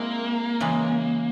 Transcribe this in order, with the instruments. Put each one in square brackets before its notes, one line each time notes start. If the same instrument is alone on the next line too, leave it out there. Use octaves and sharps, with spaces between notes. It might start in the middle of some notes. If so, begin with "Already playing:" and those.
Already playing: [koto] G#3 C4 E4 [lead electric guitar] A#3
[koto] C#3 E3 G#3